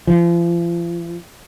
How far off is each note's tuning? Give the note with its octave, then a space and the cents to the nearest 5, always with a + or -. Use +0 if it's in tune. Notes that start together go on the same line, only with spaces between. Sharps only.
F3 -40